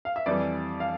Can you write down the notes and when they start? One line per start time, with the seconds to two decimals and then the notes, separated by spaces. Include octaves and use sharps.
0.05 F5
0.16 E5
0.26 F2 E3 G3 D5
0.80 F5